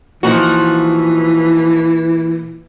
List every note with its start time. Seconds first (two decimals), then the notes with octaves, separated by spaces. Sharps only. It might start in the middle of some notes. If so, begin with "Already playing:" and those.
0.23 A#2 E3 F3 D#4 F#4